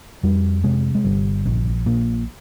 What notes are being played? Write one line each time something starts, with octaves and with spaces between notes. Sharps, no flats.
F2 G3
C3 G#3
G#3
G1 G3
A#1
A#2